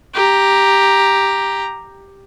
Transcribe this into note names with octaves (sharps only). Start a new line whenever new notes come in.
G4 A#5